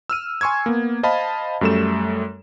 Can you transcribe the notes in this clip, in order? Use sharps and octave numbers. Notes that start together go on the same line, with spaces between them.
E6 F6 D#7
G#5 C6 C#6 E6 G#6
A#3 B3
C5 D#5 F5 A5 B5
F#2 G3 A3 A4 E7